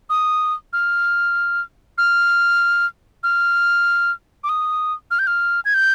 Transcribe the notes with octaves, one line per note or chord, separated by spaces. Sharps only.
D#6
F6
F6
F6
D6
D#6
F6
G6
F6
G#6
G6